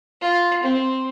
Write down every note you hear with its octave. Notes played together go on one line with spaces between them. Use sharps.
F4
C4